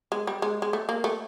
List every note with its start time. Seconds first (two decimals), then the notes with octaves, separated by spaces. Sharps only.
0.12 G#3
0.27 G3
0.42 G#3
0.62 G#3
0.73 A3
0.89 A#3
1.04 A3